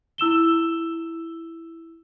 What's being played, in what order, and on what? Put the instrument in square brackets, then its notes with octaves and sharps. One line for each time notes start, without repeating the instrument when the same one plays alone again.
[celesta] E4 E6 E7 G7